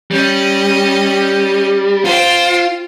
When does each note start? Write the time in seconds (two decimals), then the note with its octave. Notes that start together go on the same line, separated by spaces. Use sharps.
0.11 G3 C#4 D#5
2.05 F4 C5 G5